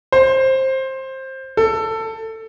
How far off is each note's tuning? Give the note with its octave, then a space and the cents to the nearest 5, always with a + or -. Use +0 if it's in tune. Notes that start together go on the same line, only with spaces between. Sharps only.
C5 +15
A4 +15